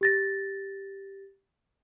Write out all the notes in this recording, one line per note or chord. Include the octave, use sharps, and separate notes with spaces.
G4 A6 A#6